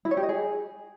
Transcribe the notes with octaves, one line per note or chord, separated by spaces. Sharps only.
E4
C#5
G4
D#5
G#4